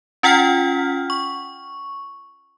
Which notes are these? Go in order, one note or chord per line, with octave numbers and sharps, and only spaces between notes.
C#4 F4 F#5 G5 F6 B6
C#6